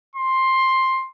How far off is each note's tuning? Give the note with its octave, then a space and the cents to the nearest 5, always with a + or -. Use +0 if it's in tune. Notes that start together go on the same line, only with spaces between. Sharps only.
C6 +10